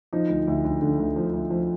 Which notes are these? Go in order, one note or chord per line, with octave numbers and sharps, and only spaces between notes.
F3 D#4
D2
D2
D2
D3
D2
F3
D2
F3